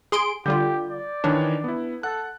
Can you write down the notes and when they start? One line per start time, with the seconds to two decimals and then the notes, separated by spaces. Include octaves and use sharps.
0.12 G#4 C6 D7
0.46 D3 G3 F4 G4 G6
0.90 D5
1.24 D#3 E3 D4 C#5
1.64 B3 E4
2.03 A4 F#5 F#6